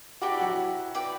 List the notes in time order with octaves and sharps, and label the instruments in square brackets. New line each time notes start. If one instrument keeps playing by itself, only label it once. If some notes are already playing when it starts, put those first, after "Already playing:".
[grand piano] F#4 [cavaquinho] G4 B4 D5 A5
[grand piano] E4
F#3 F#4
[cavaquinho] B4 D5 G5